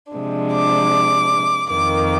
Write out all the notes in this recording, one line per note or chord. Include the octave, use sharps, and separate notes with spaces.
C3 F3 G#3 D4
D6
F2 D#3 A#3 D6